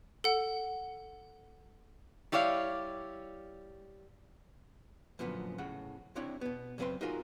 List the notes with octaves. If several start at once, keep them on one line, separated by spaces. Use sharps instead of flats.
A4 F#5
G3 E4 C#5 D5 F5
F#2 A#2 D3 F3 B3
A2 C#3 F#5
C3 C4 D4 E4 C#5 G5
B2 B3
F#2 C#3 C4 B4 G5 C6
D#4 F4 F#4 G#4 A#4